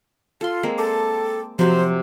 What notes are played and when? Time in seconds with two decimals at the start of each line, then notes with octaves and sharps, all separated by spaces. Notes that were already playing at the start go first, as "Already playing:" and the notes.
0.41 F4 A4 C6
0.63 G#3 A#3 C4
0.78 A4 G5 A5 D6
1.59 C3 F3 F#3 C5